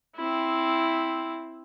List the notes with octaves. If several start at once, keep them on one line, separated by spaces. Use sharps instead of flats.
C4 E4